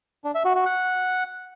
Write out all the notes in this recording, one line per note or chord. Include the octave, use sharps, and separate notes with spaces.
D4
E5
F#4
F#4
F#5